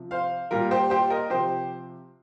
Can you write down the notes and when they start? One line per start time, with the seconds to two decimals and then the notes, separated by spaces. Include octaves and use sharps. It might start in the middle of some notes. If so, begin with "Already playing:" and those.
Already playing: C3 F3
0.11 C5 F5
0.51 A#2 G3 F4 A#4
0.71 G4 C5
0.90 G4 C5
1.10 A#4 D#5
1.30 C3 F3 G4 C5